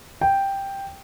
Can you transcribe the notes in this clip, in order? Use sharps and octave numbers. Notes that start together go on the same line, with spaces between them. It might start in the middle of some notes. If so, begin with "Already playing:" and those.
G5